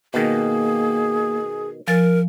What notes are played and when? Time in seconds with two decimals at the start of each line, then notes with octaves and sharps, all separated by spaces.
0.14 B2 D#3 A#3 G#4
1.88 F3 A#4 G#5 A6